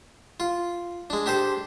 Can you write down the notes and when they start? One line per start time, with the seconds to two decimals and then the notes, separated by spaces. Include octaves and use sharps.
0.40 F4
1.10 G#3 D4
1.26 D4 G4 A4 C5